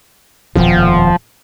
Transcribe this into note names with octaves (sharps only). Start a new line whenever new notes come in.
D#1 F2 B2 F3